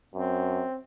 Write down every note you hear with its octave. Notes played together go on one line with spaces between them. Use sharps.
F#2 C4